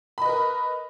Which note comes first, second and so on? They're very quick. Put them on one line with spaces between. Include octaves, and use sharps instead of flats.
B5 D#5 B4 A#4